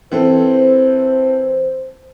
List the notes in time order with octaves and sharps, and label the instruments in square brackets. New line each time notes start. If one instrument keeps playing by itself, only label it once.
[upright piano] E3 C4 A4 [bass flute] C5